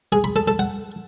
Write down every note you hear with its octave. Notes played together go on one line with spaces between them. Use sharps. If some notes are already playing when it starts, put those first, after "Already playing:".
G#4
B5
A4
A4
F#5